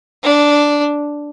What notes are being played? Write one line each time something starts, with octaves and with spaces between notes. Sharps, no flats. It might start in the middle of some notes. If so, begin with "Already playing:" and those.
D4